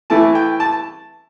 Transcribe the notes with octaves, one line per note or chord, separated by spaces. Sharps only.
E3 A3 E4 A5
G5
A5